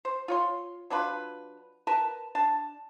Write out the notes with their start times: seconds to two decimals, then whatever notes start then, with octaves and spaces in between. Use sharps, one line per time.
0.05 C5
0.28 F4 C#5 C6
0.90 F#3 D4 F4 B4
1.87 A#4 B4 A5
2.35 D4 A5